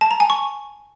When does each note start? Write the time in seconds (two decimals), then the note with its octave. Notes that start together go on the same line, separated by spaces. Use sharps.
0.01 A5
0.11 A#5
0.20 G#5
0.30 C#6